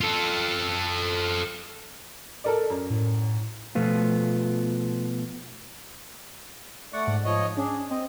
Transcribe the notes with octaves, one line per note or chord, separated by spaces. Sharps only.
F4 A4
A4 A#4 D5
F#2
A2
B2 F3 A3 B3 F4
A3 D5 F#5 C#6
G#2
F3 C#5 D#5
C#4 D4 G#4
C4 D#5